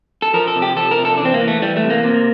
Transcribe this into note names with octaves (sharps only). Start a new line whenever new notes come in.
A4
F3 A#4
A4
C3
G4
F3 A4
A#4
C3
A4
E3 D4
C4
A#3
E3
A3
E3 G3
A3
C3
A#3
C3